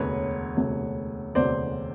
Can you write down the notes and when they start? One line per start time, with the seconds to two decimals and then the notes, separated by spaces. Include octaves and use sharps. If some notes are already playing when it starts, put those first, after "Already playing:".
Already playing: E1 D2 C3 B4 C#5
0.57 E1 D2 C3
1.35 E1 D2 C3 C5 D5